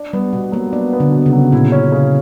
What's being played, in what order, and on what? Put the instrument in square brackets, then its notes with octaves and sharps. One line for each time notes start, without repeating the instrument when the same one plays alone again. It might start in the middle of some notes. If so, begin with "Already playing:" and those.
Already playing: [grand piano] D4
[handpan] G3 [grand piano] B3
[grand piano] B2 [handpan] G3
[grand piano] F#3 [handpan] A#3
[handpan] B3 [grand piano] D4
[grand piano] B3
[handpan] D3
[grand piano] B2
[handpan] C#3
[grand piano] F#3
[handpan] A#2 [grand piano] E4
[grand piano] C#4
C#3